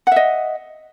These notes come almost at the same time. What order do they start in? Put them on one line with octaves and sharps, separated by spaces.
F#5 E5 D#5